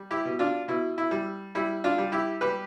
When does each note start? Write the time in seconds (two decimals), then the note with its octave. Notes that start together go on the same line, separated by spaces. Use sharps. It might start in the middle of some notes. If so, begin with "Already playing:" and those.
Already playing: G3
0.11 E4 G4
0.25 B2
0.39 D4 F4
0.68 B2 E4
0.98 E4
1.11 G3
1.55 G3 E4
1.84 D4 F4
1.98 G3
2.12 E4 G4
2.41 G3 G4 B4